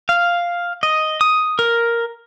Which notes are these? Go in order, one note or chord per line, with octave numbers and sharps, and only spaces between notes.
F5
D#5
D#6
A#4